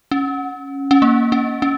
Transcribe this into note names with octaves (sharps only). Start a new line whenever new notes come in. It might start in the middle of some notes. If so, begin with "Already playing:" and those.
C#4
C#4
A#3
C#4
C#4